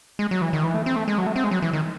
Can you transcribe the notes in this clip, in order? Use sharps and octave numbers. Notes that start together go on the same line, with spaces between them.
G#3
F#3
E3
D#3
E3
A3
C4
A3
G#3
F#3
A3
C4
G#3
F#3
E3
D#3